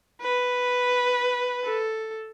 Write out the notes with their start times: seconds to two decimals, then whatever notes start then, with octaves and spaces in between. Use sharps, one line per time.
0.21 B4
1.64 A4